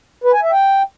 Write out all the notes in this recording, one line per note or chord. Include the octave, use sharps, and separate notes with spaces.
B4
G#5
E5
G5